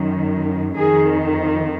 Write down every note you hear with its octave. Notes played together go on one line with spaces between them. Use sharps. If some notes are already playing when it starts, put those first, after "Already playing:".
Already playing: F#2 D#3
F2 D#3 G#4